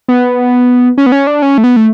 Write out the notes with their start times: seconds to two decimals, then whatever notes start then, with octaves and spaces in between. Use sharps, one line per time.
0.08 B3
0.98 C#4
1.06 B3
1.12 C#4
1.27 D4
1.42 C#4
1.58 A3
1.64 B3
1.76 A3